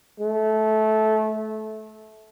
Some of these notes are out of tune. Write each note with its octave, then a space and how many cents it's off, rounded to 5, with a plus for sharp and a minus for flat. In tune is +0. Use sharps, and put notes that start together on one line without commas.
A3 -20